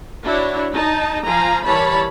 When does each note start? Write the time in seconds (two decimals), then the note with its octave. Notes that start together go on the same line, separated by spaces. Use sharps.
0.23 D4 E4 F#4 C#5
0.73 D#4 D#5 A5
1.25 F3 F5 G#5 A#5
1.65 E3 G3 A#4 C#5 A5 B5